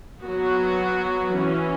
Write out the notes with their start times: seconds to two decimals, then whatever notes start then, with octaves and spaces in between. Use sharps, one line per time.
0.22 F#3 B3 F#4
1.36 E3 C#4